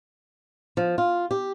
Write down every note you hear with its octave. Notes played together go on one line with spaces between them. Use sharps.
F3
F4
G4